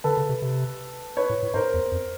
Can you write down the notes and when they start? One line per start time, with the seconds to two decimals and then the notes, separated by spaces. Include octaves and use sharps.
0.04 D3 A4 B4
0.17 C#3
0.29 C3
0.42 C3
1.17 B4 C#5
1.30 A2
1.43 A2
1.54 G#2 A#4 C5
1.74 E2
1.92 F2